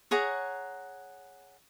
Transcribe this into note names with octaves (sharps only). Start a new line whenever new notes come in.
G#4 C#5 F#5 A#5